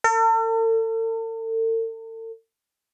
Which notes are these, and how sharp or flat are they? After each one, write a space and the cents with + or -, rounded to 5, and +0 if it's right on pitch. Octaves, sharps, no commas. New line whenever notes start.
A4 +45